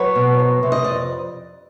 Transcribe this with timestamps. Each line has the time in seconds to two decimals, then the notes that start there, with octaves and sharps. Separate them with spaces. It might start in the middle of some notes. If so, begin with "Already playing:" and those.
Already playing: F#3 B4 C#5
0.15 B2
0.39 F2
0.63 C3
0.72 D#5
0.84 F2 D5